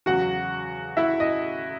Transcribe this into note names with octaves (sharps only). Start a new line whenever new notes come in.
E2 C#3 F#3 F#4 F#5
E4 E5
D#5